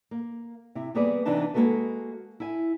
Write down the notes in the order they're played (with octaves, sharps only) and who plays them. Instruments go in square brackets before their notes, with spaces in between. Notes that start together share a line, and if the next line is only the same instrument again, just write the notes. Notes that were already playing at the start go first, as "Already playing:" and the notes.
[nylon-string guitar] A#3
C3 E4
G3 A#3 B3 G#4 B4 D5
C3 E3 B3 D4 D#4 A5
G#3 A#3 D#4 F#4 A4 B4
E4 G#5